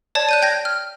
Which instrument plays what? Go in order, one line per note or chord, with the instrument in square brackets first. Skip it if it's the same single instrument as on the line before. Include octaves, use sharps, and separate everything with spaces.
[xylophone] C#5 D5 A5 G#6
F#6 G6 D#7
G5 G6 G#6 A#6
F6